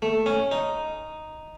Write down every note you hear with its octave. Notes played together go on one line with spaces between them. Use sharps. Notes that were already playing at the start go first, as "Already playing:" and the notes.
A3
C#4
D#4